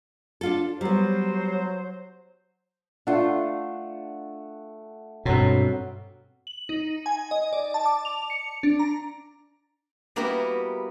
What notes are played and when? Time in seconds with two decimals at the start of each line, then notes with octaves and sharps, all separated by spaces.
0.41 D4 F4 A4
0.81 F#3 G3 B3 C5
3.07 A3 D4 F4 F#5
5.25 G2 B2 F#3 C4 A4
6.47 F#7
6.69 D#4
7.06 G#5
7.31 D#5
7.53 D5
7.74 A5
7.86 D6
8.05 F7
8.30 C#7
8.63 D4
8.79 A#5
10.16 G3 A#3 B3 E4 F#4 G4